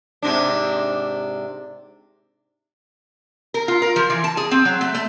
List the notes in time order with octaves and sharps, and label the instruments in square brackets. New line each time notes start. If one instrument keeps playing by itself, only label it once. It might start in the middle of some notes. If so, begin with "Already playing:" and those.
[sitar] G#2 C3 D4
[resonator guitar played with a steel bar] A#4
F4
A#4
F3
E3
A5
G#4
C4
F#3
A3
A3